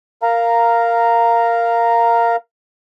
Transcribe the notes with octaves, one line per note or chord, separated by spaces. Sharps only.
A#4 F5 A#5